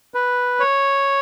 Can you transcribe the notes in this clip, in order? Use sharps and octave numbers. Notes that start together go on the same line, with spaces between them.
B4
C#5